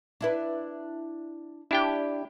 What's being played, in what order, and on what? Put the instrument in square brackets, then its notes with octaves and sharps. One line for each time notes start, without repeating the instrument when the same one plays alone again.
[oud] D4 E4 B4
[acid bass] D4 [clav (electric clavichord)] E4 G4 G5